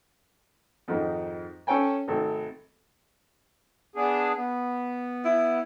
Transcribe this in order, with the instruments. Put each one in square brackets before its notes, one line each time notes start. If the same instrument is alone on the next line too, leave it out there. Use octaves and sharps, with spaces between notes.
[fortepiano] F2 G#2 D#3 D#4
C#4 A4 C#5 G5 G#5
G#1 C3 A3
[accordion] B3 D4 G#4
B3
[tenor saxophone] E4